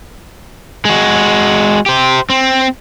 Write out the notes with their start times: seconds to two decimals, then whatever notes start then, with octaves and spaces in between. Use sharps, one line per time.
0.85 G#3 F#4
1.86 G4 C5
2.30 C4